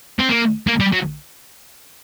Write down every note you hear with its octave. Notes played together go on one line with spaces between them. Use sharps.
C4
A#3
A#3
G3
F#3